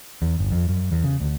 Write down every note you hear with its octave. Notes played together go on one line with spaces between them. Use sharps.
E2
G1
F2
F#2
E2
C#3
D2